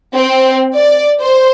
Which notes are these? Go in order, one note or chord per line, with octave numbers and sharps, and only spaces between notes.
C4
D5
C5